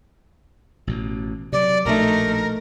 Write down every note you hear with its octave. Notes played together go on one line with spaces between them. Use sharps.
A1 B2
C3 F3 F#3 D5
A#1 B2 A3 D#4 A#4